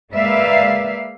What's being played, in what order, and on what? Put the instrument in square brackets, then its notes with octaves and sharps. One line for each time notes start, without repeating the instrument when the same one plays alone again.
[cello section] G#3 A#3 B4 D5 E5 F5